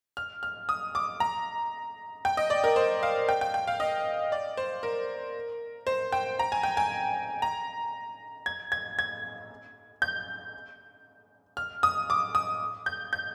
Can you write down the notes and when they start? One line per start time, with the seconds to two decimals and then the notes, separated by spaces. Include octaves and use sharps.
0.17 F6
0.43 F6
0.69 D#6
0.95 D6
1.20 A#5
2.25 G5
2.37 D#5
2.50 D5
2.64 A#4
2.76 C5
3.03 F5
3.29 G5
3.41 G5
3.54 G5
3.67 F5
3.80 D#5
4.32 D5
4.57 C5
4.83 A#4
5.87 C5
6.12 G5
6.39 A#5
6.52 G#5
6.63 G5
6.77 G#5
7.42 A#5
8.46 G#6
8.72 G#6
8.99 G#6
10.02 G6
11.57 F6
11.83 D#6
12.10 D6
12.35 D#6
12.86 G6
13.13 G6